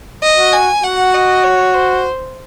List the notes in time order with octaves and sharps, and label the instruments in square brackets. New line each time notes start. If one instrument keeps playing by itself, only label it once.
[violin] D#5
[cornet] F#4
[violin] G#5
[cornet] F#4 [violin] F#5
[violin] D#5
C#5
C5